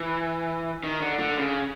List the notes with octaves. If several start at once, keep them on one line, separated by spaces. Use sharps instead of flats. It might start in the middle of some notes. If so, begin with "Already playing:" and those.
Already playing: E3
D#3
D3
D3
C#3